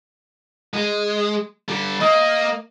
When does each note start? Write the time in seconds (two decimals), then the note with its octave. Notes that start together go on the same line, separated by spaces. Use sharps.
0.74 G#3
1.69 D3 G3
2.00 A#3 D#5